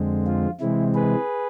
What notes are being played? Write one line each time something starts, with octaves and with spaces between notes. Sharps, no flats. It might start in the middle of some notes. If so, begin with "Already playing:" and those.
Already playing: F2 D3 G#3 C4
F4
C3 E3 G#3 C4 E4
G#4 B4